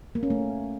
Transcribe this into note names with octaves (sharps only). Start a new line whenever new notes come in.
A#3
C#4
A3